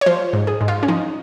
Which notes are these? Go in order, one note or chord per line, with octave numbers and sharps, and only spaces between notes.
C#5
F3 C5
G#2
G#4
G#2
F4
C#4
F3 D#4